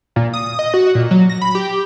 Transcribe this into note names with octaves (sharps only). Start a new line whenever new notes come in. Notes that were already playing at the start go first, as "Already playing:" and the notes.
A#2
D#6
D#5
F#4
A#2
F#3
A#6
B5
G4